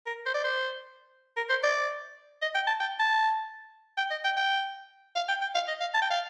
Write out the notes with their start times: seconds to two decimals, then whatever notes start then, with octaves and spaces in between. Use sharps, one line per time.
0.06 A#4
0.26 C5
0.34 D5
0.44 C5
1.36 A#4
1.49 C5
1.63 D5
2.42 D#5
2.55 G5
2.67 A5
2.80 G5
2.99 A5
3.97 G5
4.11 D#5
4.24 G5
4.37 G5
5.16 F5
5.29 G5
5.41 G5
5.54 F5
5.68 D#5
5.80 F5
5.94 A5
6.02 G5
6.11 F5